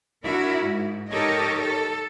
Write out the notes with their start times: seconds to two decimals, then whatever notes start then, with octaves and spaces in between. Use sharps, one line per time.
0.23 D4 E4 F#4 A#4
0.62 G#2
1.10 D#4 G4 A4 A#4 C#5 D#5
1.63 A4